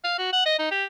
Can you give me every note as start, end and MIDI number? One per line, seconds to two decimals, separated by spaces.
0.04 0.15 77
0.18 0.31 66
0.33 0.43 78
0.46 0.58 75
0.59 0.70 63
0.71 0.84 67